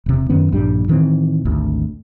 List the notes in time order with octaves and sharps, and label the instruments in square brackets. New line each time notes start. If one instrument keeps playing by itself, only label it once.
[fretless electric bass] E1 C3
F#2 D#3 B3 C#4
A#1 G2 G3 D4
A2 D#3 E3 C4
G#1 D2